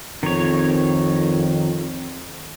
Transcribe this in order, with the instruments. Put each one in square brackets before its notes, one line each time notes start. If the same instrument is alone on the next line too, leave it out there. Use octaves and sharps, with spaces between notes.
[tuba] F2 [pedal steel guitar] D#3 C#5